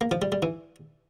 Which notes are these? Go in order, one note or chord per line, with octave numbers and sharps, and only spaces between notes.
A#3
F3
G3
G3
E3